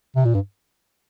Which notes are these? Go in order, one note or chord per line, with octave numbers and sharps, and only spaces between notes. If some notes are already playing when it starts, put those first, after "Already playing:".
C3
A#2
G2